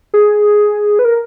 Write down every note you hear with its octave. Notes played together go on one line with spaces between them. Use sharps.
G#4
B4
A#4